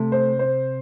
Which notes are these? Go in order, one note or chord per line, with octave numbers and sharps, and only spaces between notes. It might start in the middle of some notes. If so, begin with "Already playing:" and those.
Already playing: C3 A3
C5
C5